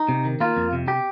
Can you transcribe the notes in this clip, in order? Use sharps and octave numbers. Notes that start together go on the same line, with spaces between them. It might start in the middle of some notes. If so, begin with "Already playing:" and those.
Already playing: D#4
C3
D#3
A#3 F4
F2
C3
G4